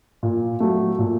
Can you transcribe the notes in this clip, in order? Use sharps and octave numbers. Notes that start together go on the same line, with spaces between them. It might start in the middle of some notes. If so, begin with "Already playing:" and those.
A#2
F#3 A3
A#2